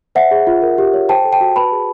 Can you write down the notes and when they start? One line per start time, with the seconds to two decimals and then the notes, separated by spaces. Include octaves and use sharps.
0.15 C5 E5 F#5
0.31 G#4
0.47 F4
0.62 A#4
0.78 G4
0.94 C#5
1.09 C5 G5 A5
1.25 A4
1.33 G5 A5
1.41 F#4
1.56 B4 A5 B5
1.72 G#4